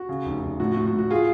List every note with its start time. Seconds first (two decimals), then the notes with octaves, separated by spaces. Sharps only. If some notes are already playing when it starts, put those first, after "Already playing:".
Already playing: F#4
0.09 C#3
0.25 F1
0.42 F1
0.60 A2 F#4
0.72 F#4
0.77 A2
0.86 F#4
0.93 A2
0.99 F#4
1.10 F4 G#4